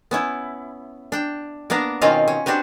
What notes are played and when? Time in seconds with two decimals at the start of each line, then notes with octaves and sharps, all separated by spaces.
0.11 B3 C#4 E4
1.12 D4 G5
1.70 A#3 B3 D4 A#4
2.01 B2 D#3 C4 C#4 F4 F5
2.28 C#4
2.46 C4 D4 F#4 G4 B4